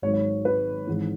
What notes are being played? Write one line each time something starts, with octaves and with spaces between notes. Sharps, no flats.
G#1 G#2 D#3 F#3 C#5
C#5
B4
G#1 G#2 E3